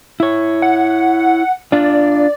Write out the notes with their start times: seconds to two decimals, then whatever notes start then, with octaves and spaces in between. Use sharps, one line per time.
0.20 E4 C#5
0.62 F#5
1.72 D4 F4 D5